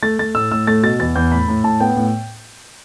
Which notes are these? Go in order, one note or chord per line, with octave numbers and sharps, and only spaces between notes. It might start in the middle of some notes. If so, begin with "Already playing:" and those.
A3 A6
A3 A6
A2 E6
A2 E6
A3 A6
B2 A6
E2 A6
E2 G6
A2 B5
A2
A2 A5
B3 G5
A2